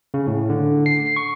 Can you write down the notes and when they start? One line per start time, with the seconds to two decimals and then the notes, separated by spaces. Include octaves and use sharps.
0.14 C#3
0.27 A2
0.50 D3
0.86 C7
1.16 C#6